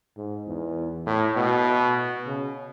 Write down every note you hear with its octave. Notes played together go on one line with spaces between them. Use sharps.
G#2
E2
A2
B2
C#3